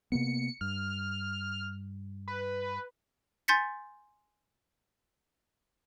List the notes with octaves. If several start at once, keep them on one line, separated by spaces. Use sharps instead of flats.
C3 A#3 B3 C#7
G2 F6
B4
G#5 C6 G6 A6 B6 C#7